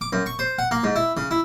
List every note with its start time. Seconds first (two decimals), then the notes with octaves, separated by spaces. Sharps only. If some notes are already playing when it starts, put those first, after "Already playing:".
0.01 D6
0.13 F#2
0.26 C#6
0.39 C5
0.59 F#5
0.71 A#3
0.84 G#2
0.96 E4
1.17 C#3
1.31 E4